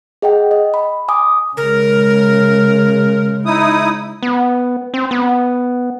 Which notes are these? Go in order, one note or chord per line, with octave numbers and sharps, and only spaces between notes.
G#4 D#5 F#5 G5
D#5
B5
G#5 D6 D#6
C#3 G#3 A#4
D#4 E4 D#6
B3
C4
B3